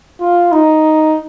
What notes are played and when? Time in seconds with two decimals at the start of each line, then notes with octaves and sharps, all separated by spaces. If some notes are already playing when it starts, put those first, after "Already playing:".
0.21 F4
0.52 D#4